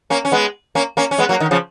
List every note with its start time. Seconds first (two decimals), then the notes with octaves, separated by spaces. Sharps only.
0.10 A#3 C#4
0.25 C#4
0.32 G#3 B3
0.75 A#3 C#4
0.97 A#3 C#4
1.11 C#4
1.18 G#3 B3
1.29 F#3 A#3
1.40 D#3
1.51 C#3 F3